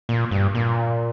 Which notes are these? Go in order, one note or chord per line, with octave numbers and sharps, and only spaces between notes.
A#2
G2
A#2